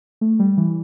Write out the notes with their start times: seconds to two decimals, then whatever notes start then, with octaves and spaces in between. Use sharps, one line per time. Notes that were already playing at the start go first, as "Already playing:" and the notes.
0.21 A3
0.39 G3
0.57 E3